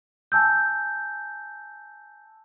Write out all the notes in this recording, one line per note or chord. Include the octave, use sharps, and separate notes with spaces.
G#5 A5 E6 G6